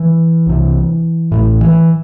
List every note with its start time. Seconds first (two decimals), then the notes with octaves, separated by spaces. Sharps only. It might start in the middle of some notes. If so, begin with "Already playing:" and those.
Already playing: E3
0.47 C2 C3
1.32 A1 A2
1.61 E3